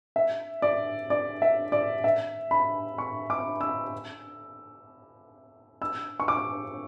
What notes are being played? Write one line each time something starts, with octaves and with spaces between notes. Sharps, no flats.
E5
D5
D5
E5
D5
E5
B5
C#6
D6
E6
E6
C#6
D6